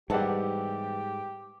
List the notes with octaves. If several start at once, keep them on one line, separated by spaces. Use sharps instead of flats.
G#2 E3 G3 B3 G4 F#5 A5